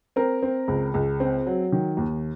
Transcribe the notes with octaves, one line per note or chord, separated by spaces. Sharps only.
C4 A#4
C4
C#2
C#2
C4
F#3
D#3
D#2